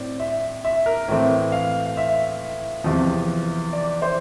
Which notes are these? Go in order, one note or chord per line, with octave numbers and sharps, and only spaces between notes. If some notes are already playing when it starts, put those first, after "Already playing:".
Already playing: A2 C4 D5
E5
E5
A#4
A2 E3 A3 C4
F5
F5
E5
E2 C3 F3
D5
C5